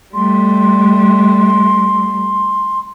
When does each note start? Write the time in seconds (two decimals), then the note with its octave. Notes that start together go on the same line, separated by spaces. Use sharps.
0.14 G3 A3 C6